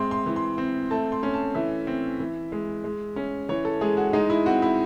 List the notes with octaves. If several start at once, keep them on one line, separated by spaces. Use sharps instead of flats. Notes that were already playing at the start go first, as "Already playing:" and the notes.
Already playing: G#3 C4 C6
C6
E3
C6
C4
A3 A5
C6
C#4
A5
E3 E5
C4
E3
G#3
G#3
C#4
E3 C#5
A4
G#3 G#4
F#4
G#3 D#4
E4
C4 F#4
E4